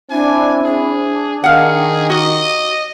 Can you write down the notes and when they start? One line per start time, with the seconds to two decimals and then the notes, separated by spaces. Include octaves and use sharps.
0.10 C4 D4 E4 G#5
0.65 D4 G#4
1.44 D#3 G#4 F5 F#5
2.10 F#4 D#5